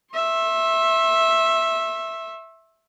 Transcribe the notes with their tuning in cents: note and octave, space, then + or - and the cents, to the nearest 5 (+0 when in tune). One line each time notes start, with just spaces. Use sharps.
E5 +0 C6 +45